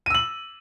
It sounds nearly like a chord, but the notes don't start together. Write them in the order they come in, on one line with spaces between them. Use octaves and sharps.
D#7 E6 F#7